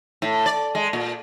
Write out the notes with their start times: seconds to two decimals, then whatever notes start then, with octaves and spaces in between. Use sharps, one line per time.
0.22 A2
0.46 D5
0.75 G#3
0.93 A#2